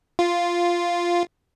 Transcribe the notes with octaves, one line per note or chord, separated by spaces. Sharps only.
F4